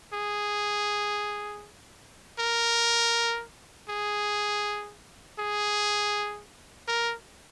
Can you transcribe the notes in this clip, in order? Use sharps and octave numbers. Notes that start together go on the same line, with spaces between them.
G#4
A#4
G#4
G#4
A#4